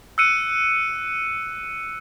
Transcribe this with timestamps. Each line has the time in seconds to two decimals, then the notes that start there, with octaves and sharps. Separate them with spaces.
0.18 E6 F#6 C#7 D#7